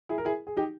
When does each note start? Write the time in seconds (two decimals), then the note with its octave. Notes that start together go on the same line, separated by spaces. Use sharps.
0.09 E4 G#4
0.18 A#4
0.25 E4 G#4
0.47 G#4
0.57 D#4 G4